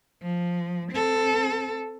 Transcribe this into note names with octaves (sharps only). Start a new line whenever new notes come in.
F3
C4 A4